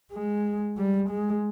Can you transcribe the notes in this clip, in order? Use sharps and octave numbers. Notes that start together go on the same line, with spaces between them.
G#3
G3
G#3